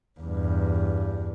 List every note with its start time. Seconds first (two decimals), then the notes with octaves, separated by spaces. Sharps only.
0.21 E2 G2